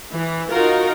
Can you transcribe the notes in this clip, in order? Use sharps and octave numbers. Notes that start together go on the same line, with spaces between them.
E3
D#4 F4 F#4 A#4